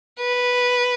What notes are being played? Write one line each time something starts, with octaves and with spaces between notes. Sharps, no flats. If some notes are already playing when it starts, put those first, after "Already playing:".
B4